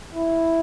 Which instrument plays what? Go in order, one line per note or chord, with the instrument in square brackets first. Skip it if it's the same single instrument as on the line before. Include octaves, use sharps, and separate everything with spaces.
[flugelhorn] E4